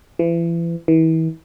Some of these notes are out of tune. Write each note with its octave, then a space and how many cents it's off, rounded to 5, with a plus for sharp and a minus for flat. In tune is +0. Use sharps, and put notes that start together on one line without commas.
E3 +35
E3 -35